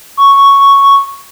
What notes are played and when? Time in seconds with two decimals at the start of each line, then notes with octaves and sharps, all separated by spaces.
0.17 C#6